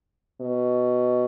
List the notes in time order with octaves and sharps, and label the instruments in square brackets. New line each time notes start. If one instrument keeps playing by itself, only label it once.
[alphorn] B2